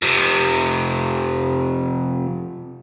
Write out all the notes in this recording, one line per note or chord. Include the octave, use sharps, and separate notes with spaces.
F2 C3